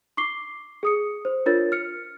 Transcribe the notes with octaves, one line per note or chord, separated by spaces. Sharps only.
C#6 D6 C7 G7
G#4 D#6 C#7
C5
D4 F4 A#4 C#5 A6
F6 C#7